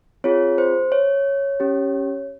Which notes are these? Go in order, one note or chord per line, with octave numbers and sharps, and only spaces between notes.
C4 F4 G#4 C#5
C5
C#5
C#4 G4